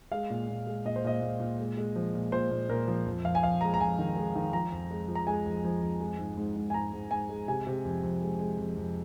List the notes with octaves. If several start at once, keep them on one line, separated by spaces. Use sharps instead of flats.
G#3 F5
A#2
A#2
G#3
A#2 D#5
C5
A#2 D#5
A#2
A#2
G#3
G#3
F3
A#2
A#2 C5
A#2
A#2 A#4
F3
F2
F2 F5
G#5
F2 F5
G#3 A#5
A#5
F2 G#5
D#3
G#3
D#3
F3 A#5
F2
G#3
F3
A#5
G#3 G#5
F2
F3
F2
G#3
G#2
G#2
G#2
G#5
G#2 A#5
G#2
G#2 G#5
G#3
C3 G#5
C3
F2
F2
G#3
G#3
F2
F2